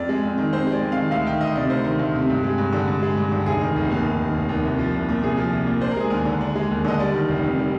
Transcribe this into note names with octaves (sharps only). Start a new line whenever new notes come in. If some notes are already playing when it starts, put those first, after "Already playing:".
Already playing: F2 D5
G#3
F2
D#3
F2 C5
G#3
D5
F2
D#3 F5
D2 F5
D#3 G5
D2 D#5
C3 D5
D2 C5
D#3
D2
C3
G2
G#3
G2
D3
G2
G#3
G2
D3
F1 G#4
D#3
F1
D#2
F1
D#3
F1
D#2
C2
F3
C2
A#2
C2 G#4
F3
C2
A#2
D4 C5
A#4
G#3 G#4
D#2 A#4
D3
D4
G#3
D#2
D3 D#5
G3 D5
D#3
F1
F2
G3